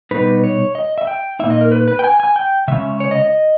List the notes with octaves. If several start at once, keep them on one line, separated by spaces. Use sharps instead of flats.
B2 G3 B3 D#4 B4
C#5
D#5
E5
G5
A#2 A#3 D#4 E5
D#5
A#4
B4
B4
G5
G#5
G#5
G5
C#3 G#3 C#4 E5
C#5
D#5
D#5